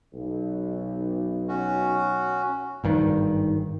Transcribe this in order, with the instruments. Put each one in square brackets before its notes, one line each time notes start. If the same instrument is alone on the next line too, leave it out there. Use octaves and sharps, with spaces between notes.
[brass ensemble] B1
[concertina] C#4 F#4
[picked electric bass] G#1 G2 D#3